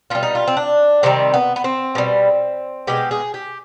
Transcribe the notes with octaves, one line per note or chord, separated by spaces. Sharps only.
B2 G3 F4
D#4
F4
C4
D4
C3 D#3 G3 C4
B3
B3
C4
B2 G3
B2 G#3 G4
G#4
G4